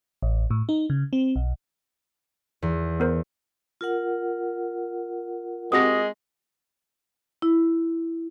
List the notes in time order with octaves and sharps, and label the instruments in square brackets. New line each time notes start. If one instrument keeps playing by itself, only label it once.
[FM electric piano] A1
A2
D#4
C#3
C4
B1
[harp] E2
[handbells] B3 A#4 C5
[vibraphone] F4 A#4 F#5
[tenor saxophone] G#3 [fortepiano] C4 F#4 G4 [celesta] D#6 A#6
[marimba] E4